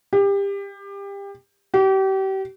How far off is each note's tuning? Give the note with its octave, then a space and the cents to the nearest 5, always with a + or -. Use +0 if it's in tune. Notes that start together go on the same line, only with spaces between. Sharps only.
G4 +25
G4 -35